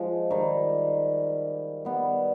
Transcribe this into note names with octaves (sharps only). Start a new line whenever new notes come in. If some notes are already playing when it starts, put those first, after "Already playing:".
Already playing: F3 G#3
D#3 G3
G3 B3